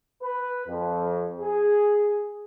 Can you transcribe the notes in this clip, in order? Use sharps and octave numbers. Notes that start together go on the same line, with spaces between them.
B4
F2
G#4